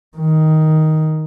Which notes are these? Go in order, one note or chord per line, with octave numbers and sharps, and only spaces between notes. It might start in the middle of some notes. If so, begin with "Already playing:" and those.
D#3